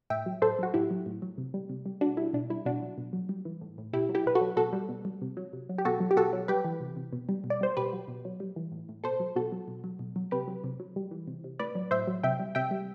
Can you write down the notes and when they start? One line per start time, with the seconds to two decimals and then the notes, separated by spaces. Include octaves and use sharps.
0.10 A2 E5 G5
0.26 F#3
0.42 A2 A4 C5
0.59 F#3 F#4
0.74 A2 E4 G4
0.91 F#3
1.06 A2
1.22 F#3
1.38 C3
1.54 G3
1.69 C3
1.86 G3
2.01 B2 D4 F#4
2.17 G3 E4
2.33 B2 D4
2.50 G3 E4
2.66 B2 D4 F#4
2.82 F#3
2.98 B2
3.13 F#3
3.29 G3
3.45 E3
3.61 A2
3.78 A2
3.93 B2 E4 G4
4.09 F#3
4.15 E4 G4
4.26 B2 B4
4.35 F#4 A4
4.41 F#3
4.57 B2 F#4 A4
4.73 G3
4.89 B2
5.05 G3
5.22 C3
5.37 F#3
5.53 C3
5.69 F#3
5.78 G4
5.85 B2 F#4 A4
6.00 F#3
6.11 G4
6.17 B2 F#4 A4
6.33 F#3
6.48 G3 G4 B4
6.65 E3
6.80 C3
6.96 C3
7.13 B2
7.29 G3
7.44 B2
7.50 D5
7.61 G3 C5
7.77 B2 G4 B4
7.93 F#3
8.08 B2
8.25 F#3
8.40 G3
8.56 E3
8.72 A2
8.89 A2
9.04 B2 A4 C5
9.20 F#3
9.36 B2 F#4 A4
9.52 F#3
9.68 B2
9.84 F#3
9.99 B2
10.16 F#3
10.31 C3 G4 B4
10.48 F#3
10.64 C3
10.80 F#3
10.96 G3
11.11 E3
11.27 C3
11.44 C3
11.59 A2 B4 D5
11.75 F#3
11.91 A2 C5 E5
12.07 F#3
12.23 C3 E5 G5
12.39 G3
12.55 C3 E5 G5
12.71 G3